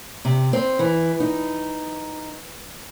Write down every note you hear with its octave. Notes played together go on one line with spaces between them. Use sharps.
C3
C4
E3
D#4